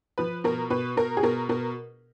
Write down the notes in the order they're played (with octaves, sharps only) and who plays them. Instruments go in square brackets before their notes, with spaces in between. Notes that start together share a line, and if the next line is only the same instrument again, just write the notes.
[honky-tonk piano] F3 B4
B2 A#4
B2 B4
B2 A#4
G#4
B2 A#4
B2 A#4